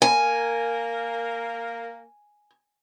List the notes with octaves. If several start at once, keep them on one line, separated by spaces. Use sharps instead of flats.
A#3 A#4 G#5